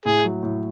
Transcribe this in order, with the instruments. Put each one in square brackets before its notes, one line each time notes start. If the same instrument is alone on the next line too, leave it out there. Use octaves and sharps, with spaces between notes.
[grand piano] A2 [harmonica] G#4
[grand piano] F#3
A2